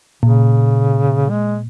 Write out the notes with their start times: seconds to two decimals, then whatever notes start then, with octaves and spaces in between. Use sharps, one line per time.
0.23 A#2 C#3
1.30 G#3